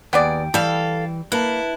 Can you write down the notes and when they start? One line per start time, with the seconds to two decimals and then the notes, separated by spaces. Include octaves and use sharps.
0.13 D#2 B3 G#4 D5 G5
0.54 E3 G3 A4 F5
1.32 A#3 E4 B4 A5